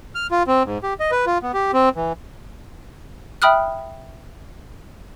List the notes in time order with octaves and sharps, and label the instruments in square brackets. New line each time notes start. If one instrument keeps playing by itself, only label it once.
[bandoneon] F6
F4
C4
G#2
G4
D#5
B4
F4
B3
G4
C4
E3
[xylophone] E5 G5 B5 D#6 F6 F#6